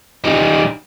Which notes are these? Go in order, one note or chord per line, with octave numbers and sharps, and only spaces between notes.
G3 D#4